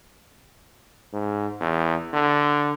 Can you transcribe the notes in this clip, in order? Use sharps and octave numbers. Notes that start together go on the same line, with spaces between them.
G#2
E2
D3